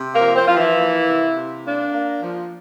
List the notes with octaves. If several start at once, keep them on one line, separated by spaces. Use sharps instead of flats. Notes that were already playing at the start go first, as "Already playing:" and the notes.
Already playing: C3
A#3 A#4
F3
C4 C5
F3 F4
E3 E4
A#3
C3
C3
A#3 D4
A#3
F3